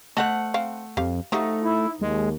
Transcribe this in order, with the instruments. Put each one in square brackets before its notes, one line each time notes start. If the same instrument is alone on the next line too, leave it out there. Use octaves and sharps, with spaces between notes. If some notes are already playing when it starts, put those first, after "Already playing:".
[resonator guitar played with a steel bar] A3 F#5 [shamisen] C5 D#5
[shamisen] C4 F5
[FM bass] F2 [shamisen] G4 F5
[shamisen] F3 F#4 G4 [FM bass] A3 [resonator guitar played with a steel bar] D#4
[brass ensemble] E4
[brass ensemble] D#2 [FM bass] G#3